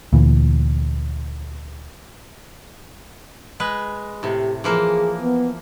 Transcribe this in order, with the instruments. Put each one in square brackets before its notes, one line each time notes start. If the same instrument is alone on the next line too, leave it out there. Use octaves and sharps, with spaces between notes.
[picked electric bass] D2 A#2 E3
[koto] G#3 B4
[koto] A2 C3 [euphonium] G4
[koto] E3 F3 A#3 [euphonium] G#4
[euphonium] B3